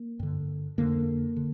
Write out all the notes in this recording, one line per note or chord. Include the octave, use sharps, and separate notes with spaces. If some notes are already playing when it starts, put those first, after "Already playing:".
Already playing: A#3
G2 D3
F2 D3 A#3
D3